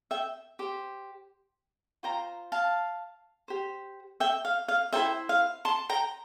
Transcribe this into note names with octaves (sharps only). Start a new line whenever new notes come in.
E5 G5
G4 C5
F4 C5 G5 A#5
F5 A5
G4 C5
E5 G5
F5
F5
E4 A4 C5 E5 G5
F5
A5 C6
G5 A#5